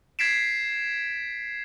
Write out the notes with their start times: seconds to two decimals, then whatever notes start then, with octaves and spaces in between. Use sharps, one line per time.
0.19 G#6 A6 B6 C7 D7 E7